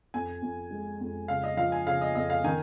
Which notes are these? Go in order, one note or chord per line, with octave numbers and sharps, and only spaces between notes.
F2 G#5
F2
G#3
F2
C#3 F5
D#5
F3 F5
G#5
C#3 F5
D#5
F2 D#5
F5
D#3 G#5